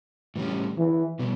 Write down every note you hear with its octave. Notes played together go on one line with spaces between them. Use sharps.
A2 E3 G3 C#4
E3
B2 G3 B3